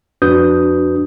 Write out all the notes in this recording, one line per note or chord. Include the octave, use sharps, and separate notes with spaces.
F2 D4 F#4 B4 D#6 G6